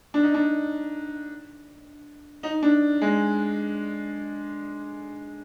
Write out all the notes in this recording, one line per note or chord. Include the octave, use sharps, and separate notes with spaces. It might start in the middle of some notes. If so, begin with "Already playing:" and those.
D4
D#4
D4
D#4
D4
G#3